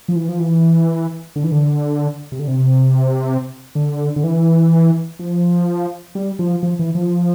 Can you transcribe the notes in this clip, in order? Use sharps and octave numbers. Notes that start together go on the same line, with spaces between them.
F3
E3
F3
E3
D3
E3
D3
C3
D3
C3
D3
D3
E3
F3
G3
F3
F3
E3
F3